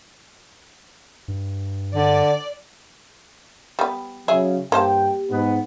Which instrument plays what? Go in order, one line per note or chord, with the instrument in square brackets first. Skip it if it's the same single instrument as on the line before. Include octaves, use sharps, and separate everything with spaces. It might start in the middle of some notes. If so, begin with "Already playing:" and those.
[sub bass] G2
[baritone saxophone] D3 [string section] D5
[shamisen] G3 B3
[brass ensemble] C#3 [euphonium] F#3 [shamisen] G#4 E5
[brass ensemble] G2 G5 [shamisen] A#3 C5 A5 [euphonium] G4
[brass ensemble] G#2 B3